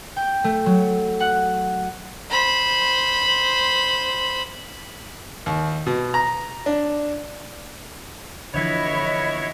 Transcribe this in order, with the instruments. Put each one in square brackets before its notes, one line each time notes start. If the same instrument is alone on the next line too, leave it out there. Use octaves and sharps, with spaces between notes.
[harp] G5
A3
F#3
F#5
[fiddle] C5 B5
[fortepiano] D#2
B2
A#5
D4
[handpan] D3 E3 F3 [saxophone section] B3 E4 C#5 [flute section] D#5 B5